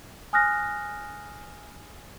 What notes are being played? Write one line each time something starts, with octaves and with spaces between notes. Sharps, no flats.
G#5 D#6 F6 F#6 A#6